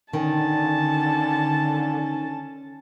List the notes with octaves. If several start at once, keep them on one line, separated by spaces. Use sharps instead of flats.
D3 D#3 C#4 A5